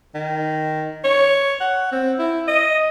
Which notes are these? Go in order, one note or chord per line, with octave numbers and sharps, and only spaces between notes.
D#3
C#5
F#5
C4
E4
D#5